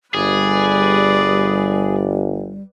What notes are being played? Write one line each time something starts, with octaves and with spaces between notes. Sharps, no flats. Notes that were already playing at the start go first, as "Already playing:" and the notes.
G1 G3 G#4 B4 D5